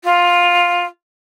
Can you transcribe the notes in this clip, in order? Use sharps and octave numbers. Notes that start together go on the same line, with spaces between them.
F4